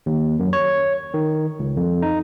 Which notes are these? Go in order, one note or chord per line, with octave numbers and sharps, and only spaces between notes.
D#2
F#2
C#5
D#3
C#2
F2
D#4